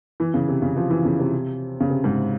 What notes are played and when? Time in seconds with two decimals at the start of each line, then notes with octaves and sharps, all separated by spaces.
0.20 E3
0.34 C#3
0.48 C3
0.62 C#3
0.76 F3
0.90 E3
1.05 C#3
1.19 C3
1.80 C#3
1.90 C3
2.04 G#2